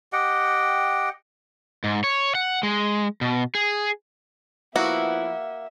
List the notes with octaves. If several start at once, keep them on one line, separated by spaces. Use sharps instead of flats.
G4 D#5 F#5 G5
G#2
C#5
F#5
G#3
B2
G#4
F3 A#3 B3 E4 F#4 E5